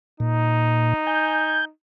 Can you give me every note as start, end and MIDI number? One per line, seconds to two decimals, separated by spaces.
0.20 0.94 46
0.20 1.72 63
1.07 1.65 80
1.07 1.65 91